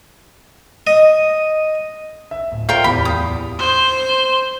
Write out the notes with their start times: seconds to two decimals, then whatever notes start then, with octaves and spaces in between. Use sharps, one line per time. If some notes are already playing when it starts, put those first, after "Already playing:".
0.87 D#5
2.31 E5
2.52 D1
2.69 F4 A#4 C5 D5 E5 G5
2.84 D1 E2 G4 B5
3.05 D#6
3.59 C5